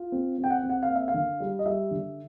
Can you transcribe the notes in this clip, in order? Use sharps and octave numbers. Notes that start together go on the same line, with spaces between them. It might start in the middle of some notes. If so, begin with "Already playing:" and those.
Already playing: F4
C4
C4
G5
F#5
C4
F#5
F5
A#3
E5
F5
D3
G3
D#5
G3 E5
D3